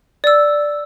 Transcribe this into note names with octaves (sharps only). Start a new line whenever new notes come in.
D5 E6